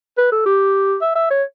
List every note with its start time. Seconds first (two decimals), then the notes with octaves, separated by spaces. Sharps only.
0.18 B4
0.32 A4
0.46 G4
1.02 E5
1.16 E5
1.31 C#5